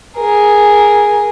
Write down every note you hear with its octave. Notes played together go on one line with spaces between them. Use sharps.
G#4 A#4